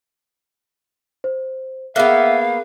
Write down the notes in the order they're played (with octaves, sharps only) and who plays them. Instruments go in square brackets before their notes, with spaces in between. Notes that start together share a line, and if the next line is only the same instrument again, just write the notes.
[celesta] C5
[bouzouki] A#3 B3 [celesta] G#4 A#4 F#6 [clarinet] E5 [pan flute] F5